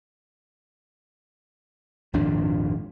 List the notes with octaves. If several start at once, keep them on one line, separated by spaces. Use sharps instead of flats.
G#1 F2 A#2 D4